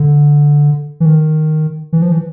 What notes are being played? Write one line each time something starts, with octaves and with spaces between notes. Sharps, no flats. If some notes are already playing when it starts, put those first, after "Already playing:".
Already playing: D3
E3
D#3
E3
F3
E3